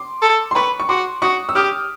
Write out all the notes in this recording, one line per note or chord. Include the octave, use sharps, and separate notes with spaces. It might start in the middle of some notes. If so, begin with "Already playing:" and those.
Already playing: C6 D6
A4
C6
B4 B5 C#6
C#6
F#4 C6 D6
F#4 C#6 D#6
E6
G4 D#6 F6